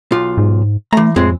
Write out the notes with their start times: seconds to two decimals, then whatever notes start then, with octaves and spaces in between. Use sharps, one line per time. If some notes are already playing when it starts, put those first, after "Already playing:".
0.12 B1 F4
0.38 G#2
0.93 E3 A3 A#5
1.16 F2 A2 G#3 C4